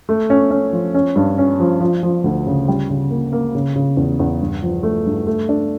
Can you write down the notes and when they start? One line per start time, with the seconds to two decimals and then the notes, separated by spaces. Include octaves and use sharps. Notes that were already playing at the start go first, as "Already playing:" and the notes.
0.09 A3
0.30 C#4
0.51 C#4
0.73 F3
0.94 C#4
1.16 G2
1.38 C#4
1.60 F3
1.80 F3
2.03 F3
2.24 D2
2.47 C#3
2.68 G3
2.90 C#3
3.10 A#3
3.33 A#3
3.55 C#3
3.76 C#3
3.97 E2
4.20 E2
4.41 G2
4.63 F3
4.83 A3
5.06 G2
5.27 A3
5.49 D4